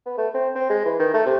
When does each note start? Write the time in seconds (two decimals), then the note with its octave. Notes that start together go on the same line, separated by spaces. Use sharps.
0.06 B3
0.18 A3
0.34 C4
0.55 C4
0.70 G#3
0.85 E3
1.00 D#3
1.14 A3
1.26 C3